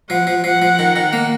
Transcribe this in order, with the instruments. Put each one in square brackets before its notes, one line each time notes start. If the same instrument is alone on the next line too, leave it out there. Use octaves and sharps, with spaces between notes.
[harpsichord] F3 [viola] F#5
[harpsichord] F3
[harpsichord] F3 [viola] F#5
[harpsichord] F3
D#3
D#3
A#3